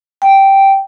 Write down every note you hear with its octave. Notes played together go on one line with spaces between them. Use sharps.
G5